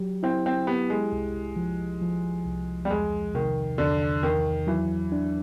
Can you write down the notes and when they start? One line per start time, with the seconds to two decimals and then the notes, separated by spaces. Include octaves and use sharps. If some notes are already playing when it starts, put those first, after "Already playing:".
Already playing: F#3 G4
0.23 C4 E4
0.46 C4
0.67 B3 G4
0.90 G#3
1.12 C2
1.56 F3
2.01 F3
2.45 C2
2.85 G3
2.89 E2 G#3
3.34 C3 D#3
3.78 E2 D3
4.23 E2 D#3
4.67 E3 F#3
5.12 D4